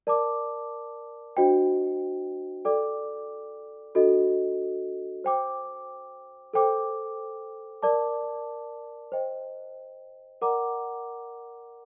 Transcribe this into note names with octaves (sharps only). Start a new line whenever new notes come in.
A#4 D5 A5 D6
D4 F#4 C5 D#5 G5
A4 D5 G5 D6
D4 F#4 A4 D#5
C5 G5 D6
A4 C5 G5 D6
A#4 D5 A5 D6
C5 D#5 G5
A#4 D5 F#5 A#5 D6